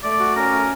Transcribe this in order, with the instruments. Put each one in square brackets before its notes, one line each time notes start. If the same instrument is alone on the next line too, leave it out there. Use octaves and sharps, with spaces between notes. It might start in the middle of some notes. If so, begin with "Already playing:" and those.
[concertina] A3 [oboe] D5
[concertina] F#4
[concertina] C#4 [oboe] A#4
[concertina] A3